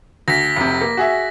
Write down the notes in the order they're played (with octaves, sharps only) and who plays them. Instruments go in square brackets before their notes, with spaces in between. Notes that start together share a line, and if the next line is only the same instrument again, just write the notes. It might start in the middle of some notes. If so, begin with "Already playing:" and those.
[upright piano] D2 [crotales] A#6 B6
[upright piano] F1 C3
A#3
F#4 G#4 E5